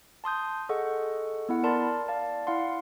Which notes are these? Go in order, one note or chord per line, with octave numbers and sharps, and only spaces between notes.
A5 C6 D#6 G6
G#4 A4 D#5 F#5 C#6
B3 E4 F#5
A#4 D5 A5 B5 C6
D5 F5 A5
E4 F5 F#5 C6